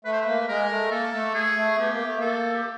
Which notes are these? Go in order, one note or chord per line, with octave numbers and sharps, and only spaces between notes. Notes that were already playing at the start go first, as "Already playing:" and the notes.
A3 B4
C5
A#3 B4
G#3 A#4
A3
A#3 A4
A3
G#4
A3
B3 G4
A#3
A3
A#3 A4
G4